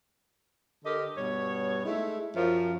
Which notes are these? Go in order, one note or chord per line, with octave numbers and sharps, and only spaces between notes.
D3 G4 A#4 D#5
G2 B2 C#5
G#3 A3 D#4 E4
F#2 F3